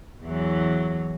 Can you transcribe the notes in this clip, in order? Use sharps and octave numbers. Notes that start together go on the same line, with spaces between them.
E2 E3 F#3